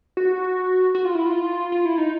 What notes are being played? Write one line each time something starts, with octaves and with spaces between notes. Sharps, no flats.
F#4
F#4
F4
E4
F4
F4
E4
D#4